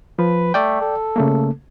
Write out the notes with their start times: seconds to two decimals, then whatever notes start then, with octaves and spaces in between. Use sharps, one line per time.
0.19 F3 B4
0.54 A3 D5 G5
0.81 A4
1.16 C#3 A3 A#3